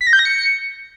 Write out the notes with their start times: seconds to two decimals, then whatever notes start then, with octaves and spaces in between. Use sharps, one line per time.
0.01 B6
0.07 A#6
0.13 G6
0.19 A#6
0.25 C#7